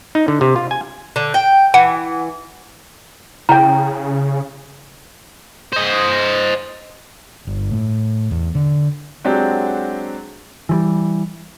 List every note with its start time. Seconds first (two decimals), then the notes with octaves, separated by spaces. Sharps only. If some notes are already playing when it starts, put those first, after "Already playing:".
0.15 D#4
0.28 D3
0.41 C3
0.56 F4
0.71 G#5
1.16 D3
1.34 G5
1.74 E3 F#5
3.49 C#3 E4 G5 A#5
5.73 C5 D#5
7.47 G1
7.71 A2
8.31 E2
8.55 D3
9.24 F#3 G#3 C4 D4 F#4 G4
10.69 E3 F3 G3